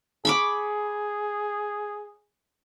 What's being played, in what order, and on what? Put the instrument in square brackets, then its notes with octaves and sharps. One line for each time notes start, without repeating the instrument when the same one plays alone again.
[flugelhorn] G#4 [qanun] B5 C#6 D6